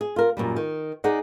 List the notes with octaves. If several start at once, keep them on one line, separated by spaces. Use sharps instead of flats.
G#4
F4 A#4
F#2 A#2 G3
D#3
D#4 G#4 D5 F#5